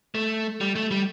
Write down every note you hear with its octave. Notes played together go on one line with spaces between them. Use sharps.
A3
G3
A3
G3